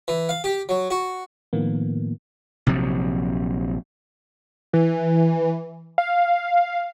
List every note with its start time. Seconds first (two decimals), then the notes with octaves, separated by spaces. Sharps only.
0.08 E3
0.29 F5
0.44 G4
0.69 F#3
0.91 F#4
1.53 A2 D#3 F3 A#3 B3
2.67 A#1 C3 F3 F#3
4.73 E3
5.98 F5